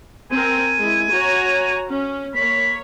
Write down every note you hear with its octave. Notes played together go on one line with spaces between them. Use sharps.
C4 A#4 G#5
G#3 E4
F#4 C#5 A#5
C#4
A#3 C#5 B5